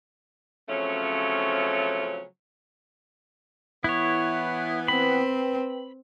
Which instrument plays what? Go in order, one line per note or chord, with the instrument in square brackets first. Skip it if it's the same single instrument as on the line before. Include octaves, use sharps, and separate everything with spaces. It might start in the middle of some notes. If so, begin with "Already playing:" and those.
[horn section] C#3 F3 F#3 A3 C4 C#4
[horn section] E3 B3 [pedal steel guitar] E4 C#5
[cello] C4 [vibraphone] B4 G5 [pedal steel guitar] B5